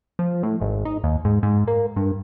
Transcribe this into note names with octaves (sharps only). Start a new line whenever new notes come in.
F3
A2
G#1
D#4
D#2
G#2
G#2
A#3
G2